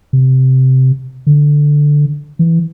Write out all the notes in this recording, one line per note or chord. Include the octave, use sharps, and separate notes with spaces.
C3
D3
E3